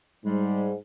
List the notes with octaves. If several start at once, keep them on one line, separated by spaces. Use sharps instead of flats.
G#2 G3 G#3